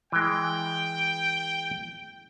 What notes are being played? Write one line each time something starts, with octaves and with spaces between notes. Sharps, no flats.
E3 G#3 G5